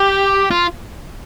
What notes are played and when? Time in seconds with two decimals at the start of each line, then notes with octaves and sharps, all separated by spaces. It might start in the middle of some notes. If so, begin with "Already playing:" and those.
Already playing: G4
0.51 F4